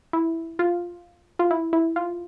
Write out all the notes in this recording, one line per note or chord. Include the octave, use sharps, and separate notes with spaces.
E4
F4
F4
E4
E4
F4